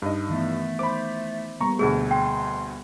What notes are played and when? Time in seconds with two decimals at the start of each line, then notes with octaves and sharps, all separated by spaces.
0.02 G2 D#4 D#5
0.29 D#3 E3 A3 B3
0.79 C5 B5 D6
1.61 G3 A#3 B3 A#5 C#6
1.79 D2 B2 A3 G#4
2.11 G5 C6